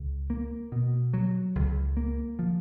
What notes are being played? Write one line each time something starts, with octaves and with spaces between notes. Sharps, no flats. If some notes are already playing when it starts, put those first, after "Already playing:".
Already playing: C#2
A#3
B2
F#3
C#2
A#3
F3